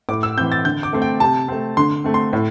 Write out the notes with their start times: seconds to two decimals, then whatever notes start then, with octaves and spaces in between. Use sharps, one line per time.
0.09 A2 D6
0.23 E6
0.37 E3 C4 G6
0.52 A6
0.65 D3 G6
0.83 D6
0.93 A3 C4
1.02 G5
1.20 C3 A5
1.48 A3 C4
1.77 D3 C6
2.04 A3 C4
2.14 C6
2.33 A2